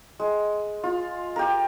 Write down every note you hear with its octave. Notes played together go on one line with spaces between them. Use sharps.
G#3
F4
G4 A#4